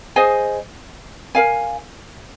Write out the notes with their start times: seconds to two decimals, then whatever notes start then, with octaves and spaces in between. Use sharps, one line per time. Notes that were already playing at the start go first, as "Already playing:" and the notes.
0.16 G#4 C5 D#5 G#5
1.35 A#4 F5 G#5